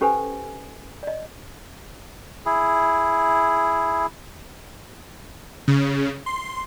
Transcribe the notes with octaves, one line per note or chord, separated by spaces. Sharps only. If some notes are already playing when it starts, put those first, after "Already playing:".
C#4 G4 A4 B4 C5 G#5
D5 D#5
E4 G#4
C#3
C6